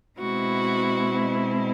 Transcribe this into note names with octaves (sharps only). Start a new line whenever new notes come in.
B2 G#3 C4 E4 F#4